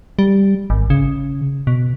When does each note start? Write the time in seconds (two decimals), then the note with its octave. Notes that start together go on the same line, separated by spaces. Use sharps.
0.19 G3
0.70 G#1
0.90 C#3
1.67 B2